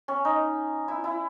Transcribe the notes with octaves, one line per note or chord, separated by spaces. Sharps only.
C#4
D#4
E4
E4